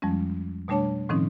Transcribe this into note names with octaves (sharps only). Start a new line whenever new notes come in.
F2 F3 G3 G#3 C#4
B2 G3 A3 D4 C#5 A5
A2 D#3 F3 C4 C#4 D#4